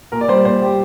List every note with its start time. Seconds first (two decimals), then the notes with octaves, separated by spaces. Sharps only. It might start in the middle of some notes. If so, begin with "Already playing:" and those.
0.12 A#2 A#4
0.21 D5
0.28 G3 C5
0.45 A#2 C5
0.62 G3 G4